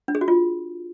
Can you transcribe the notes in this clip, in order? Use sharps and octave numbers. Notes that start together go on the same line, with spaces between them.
D4
G#4
F#4
F4